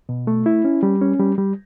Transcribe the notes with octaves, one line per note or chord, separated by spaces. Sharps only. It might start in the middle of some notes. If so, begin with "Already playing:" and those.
B2
A3
E4
C#4
G3
C#4
G3
G3